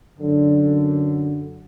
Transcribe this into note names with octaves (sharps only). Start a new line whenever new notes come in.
F#2 D3